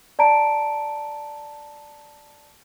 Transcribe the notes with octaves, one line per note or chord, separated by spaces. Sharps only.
D5 A5 A#5 D7